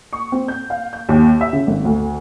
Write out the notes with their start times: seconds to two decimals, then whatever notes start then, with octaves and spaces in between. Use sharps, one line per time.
0.13 C#6
0.32 C4
0.48 G6
0.70 F5
0.93 G6
1.09 D#2
1.41 E5
1.53 C#3
1.67 G#1
1.85 D2